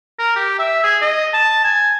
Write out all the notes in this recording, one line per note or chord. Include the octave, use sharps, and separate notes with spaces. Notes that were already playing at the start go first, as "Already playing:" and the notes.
A#4
G4
E5
G#4
D#5
A5
G#5